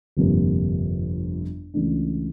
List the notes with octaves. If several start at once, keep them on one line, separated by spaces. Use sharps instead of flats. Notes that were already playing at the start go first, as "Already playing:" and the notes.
G1 F2 C3 F3 A#3
C#2 C#3 E3 A3 D4